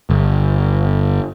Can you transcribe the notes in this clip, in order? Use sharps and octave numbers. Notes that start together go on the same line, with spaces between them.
G1